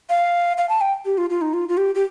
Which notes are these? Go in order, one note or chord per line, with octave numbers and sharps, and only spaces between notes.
F5
F5
A5
G5
G4
F4
F4
D#4
F4
F4
G4
G4